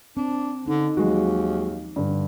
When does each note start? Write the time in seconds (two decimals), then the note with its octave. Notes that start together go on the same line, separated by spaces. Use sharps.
0.17 C4 D4
0.66 D3 C#4 D#4
0.97 D#2 D#3 F3 F#3 G#3 F#4
1.96 G2 D3